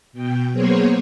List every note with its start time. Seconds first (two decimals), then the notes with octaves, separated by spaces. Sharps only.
0.13 B2 G5
0.52 F#3 A#3 B3 G#4 C5 C#5